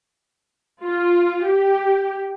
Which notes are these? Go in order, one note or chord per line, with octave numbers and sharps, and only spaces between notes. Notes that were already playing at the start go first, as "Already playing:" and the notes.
F4
G4